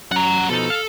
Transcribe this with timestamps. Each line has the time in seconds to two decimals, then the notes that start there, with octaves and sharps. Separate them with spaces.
0.12 F#2 F#5 A#5
0.49 B2 F3 D#4 A4
0.70 F5